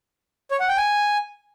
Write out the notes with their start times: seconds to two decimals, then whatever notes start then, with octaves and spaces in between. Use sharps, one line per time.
0.51 C#5
0.60 F#5
0.69 G5
0.77 G#5